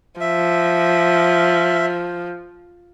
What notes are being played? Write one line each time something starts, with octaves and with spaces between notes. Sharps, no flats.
F3 E5